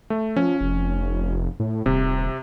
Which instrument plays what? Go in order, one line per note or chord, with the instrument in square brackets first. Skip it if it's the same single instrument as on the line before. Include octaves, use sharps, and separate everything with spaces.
[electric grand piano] A3
[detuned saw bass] F3 [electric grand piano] C#4
[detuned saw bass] F1
A2
[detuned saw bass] D#1 [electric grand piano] C3